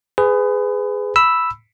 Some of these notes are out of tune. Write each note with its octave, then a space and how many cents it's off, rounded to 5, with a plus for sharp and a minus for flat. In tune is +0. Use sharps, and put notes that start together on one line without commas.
G#4 +0 B4 +30
B5 +0 E6 +0